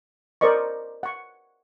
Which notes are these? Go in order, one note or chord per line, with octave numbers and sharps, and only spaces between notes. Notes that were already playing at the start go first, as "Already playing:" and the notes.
A#4 C5 D5 D#5 C#6
F#5 C#6